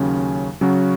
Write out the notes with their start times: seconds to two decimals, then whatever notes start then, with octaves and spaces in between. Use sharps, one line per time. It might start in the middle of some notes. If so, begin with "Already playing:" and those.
Already playing: D#2 C#3 F#3 C#4
0.61 C#3 F#3 C#4 F#4